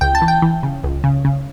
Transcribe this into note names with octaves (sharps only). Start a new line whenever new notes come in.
C#2 G5
A5
E3
G5
E3
C#3
C#2
C#3
C#3